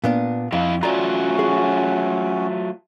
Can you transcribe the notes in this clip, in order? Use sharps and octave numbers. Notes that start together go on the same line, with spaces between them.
A#2 B3 D4
F2 E4 D#5 F5
F#3 A3 C#4 F4 F#4 D5 A#5
G#4